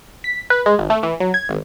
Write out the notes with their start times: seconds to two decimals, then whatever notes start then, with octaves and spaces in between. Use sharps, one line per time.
0.24 B6
0.50 B4
0.66 G#3
0.79 G#1
0.90 A3
1.03 E3
1.20 F#3
1.34 G#6
1.49 G#1